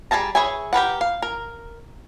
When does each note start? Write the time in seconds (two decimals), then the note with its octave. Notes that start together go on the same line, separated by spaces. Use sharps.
0.11 G3 G#4 E5 A5 A#5
0.35 G#4 B4 C#5 E5 G#5
0.73 G4 A#4 B4 F#5
1.01 F5
1.22 A#4